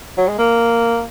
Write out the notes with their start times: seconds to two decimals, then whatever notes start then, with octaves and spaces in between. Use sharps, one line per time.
0.18 F#3
0.28 G#3
0.38 A#3